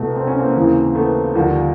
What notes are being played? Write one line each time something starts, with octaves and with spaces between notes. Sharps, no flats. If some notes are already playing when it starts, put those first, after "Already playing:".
Already playing: C2 B2 A3 B3
C4
C#4
A#3 C4
D#2 C#3 E3
A3 B3
D#2 D3 F3 G3